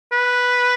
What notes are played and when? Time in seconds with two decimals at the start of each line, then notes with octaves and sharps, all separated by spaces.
0.12 B4